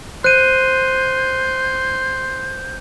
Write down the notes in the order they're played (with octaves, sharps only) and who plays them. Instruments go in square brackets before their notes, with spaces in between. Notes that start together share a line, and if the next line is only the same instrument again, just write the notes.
[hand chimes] C5 [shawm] C6 [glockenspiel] F#6 D#7 [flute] G6